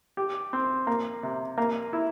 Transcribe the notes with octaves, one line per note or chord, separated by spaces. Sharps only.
G4
C4
A#3
C3
A#3
E4